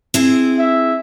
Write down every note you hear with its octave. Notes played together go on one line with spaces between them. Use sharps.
C4 E4 G#4
E5